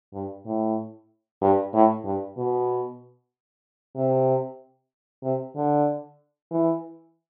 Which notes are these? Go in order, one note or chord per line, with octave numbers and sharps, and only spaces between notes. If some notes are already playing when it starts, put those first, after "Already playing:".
G2
A2
G2
A2
G2
B2
C3
C3
D3
E3